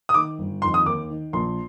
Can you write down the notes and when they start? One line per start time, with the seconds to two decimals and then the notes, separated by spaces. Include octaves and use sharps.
0.09 D#6
0.14 D#3 D6
0.39 G1
0.62 F2 D#3 C6
0.74 D#6
0.86 D#2 D6
1.10 D#3
1.33 A#1 C6